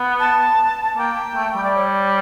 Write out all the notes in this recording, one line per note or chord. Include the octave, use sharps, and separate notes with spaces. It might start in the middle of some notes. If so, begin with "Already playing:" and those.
Already playing: B3
A5
A#3 G5
A3
G3
D5
C#5